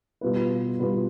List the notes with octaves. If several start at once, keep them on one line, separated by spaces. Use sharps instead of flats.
B2 G3 B3 F4 B4
B2 G3 B3 F4 B4